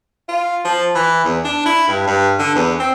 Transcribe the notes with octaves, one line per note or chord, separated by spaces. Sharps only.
F4
F3
E3
E2
D4
E4
G2
G2
D3
E2
C4